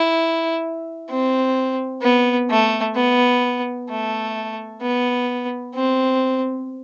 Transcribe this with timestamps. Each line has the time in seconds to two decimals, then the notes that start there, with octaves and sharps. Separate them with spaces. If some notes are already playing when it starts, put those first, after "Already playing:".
Already playing: E4
1.09 C4
2.02 B3
2.50 A3
2.95 B3
3.89 A3
4.81 B3
5.75 C4